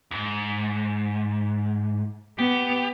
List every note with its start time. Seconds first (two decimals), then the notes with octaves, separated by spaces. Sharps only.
0.11 D#2 G#2
2.39 B3 G4